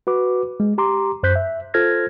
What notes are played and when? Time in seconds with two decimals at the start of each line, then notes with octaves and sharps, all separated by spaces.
0.07 F#4 B4 D6
0.60 G#3
0.78 G4 A#5 C6 D6
1.23 F#2 C5 F#6 G6 B6
1.36 E5
1.74 F4 A4 C5 F6 G#6 A#6